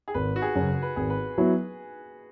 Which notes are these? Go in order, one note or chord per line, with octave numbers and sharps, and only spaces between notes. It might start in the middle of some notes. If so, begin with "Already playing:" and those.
G#4
G#1 B4
F#4
G#4
F#2 C#3
B4
G#1 G#4
B4
F#3 B3 E4